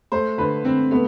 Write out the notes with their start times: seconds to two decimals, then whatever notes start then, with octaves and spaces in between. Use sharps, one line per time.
0.12 A3 C5
0.38 D3 B4
0.64 D3 C4
0.91 A3 B3